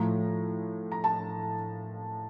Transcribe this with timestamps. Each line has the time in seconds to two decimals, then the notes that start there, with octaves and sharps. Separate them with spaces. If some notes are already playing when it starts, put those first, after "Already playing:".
Already playing: A2 F3 A3 A#5
0.92 A#5
1.04 A5